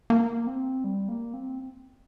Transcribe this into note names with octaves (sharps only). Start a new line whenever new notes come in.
A#3
C4
G3
A#3
C4